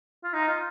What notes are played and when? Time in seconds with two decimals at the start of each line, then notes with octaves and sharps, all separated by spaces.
0.24 F4
0.33 D#4
0.48 F4